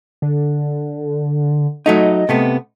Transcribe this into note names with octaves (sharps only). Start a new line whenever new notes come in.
D3
F#3 A3 D#4 D#5
C3 A3 B3